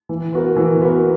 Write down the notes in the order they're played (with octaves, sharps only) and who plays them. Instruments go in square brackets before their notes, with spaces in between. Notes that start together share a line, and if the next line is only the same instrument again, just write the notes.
[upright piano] E3
B3 F#4 A#4
E3
B3 F#4 A#4